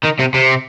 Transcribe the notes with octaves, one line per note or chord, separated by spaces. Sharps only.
D#3
C3
C3